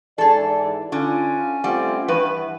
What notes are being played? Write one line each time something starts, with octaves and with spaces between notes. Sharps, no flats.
G#2 E3 G#4 A4 D5
D3 C#4 F4
G3 A3 C4 F4 F#5
G2 E3 B4